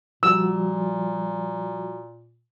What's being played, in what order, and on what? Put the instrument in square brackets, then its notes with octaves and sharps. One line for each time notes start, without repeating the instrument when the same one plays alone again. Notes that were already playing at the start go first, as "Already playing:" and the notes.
[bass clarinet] A#2 [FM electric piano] F3 G3 F#4 [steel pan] E6